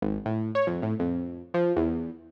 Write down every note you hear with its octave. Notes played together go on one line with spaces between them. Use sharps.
G#1
A2
C#5
F2
A2
F2
F3
E2